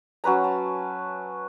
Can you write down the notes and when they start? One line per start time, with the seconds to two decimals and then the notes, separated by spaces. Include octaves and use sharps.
0.24 F#3 C#4 B4 A#5
0.44 A5